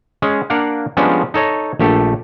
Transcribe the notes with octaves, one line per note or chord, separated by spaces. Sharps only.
G#3 C#4 G#4
A#3 D4 D5 F5 F#5
F3 G3 G#3 B3 C#4 D4
D#4 A4 C#5 D#5
A#1 A3 G4 A4